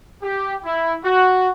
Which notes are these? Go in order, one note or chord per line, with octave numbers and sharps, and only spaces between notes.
G4
E4
F#4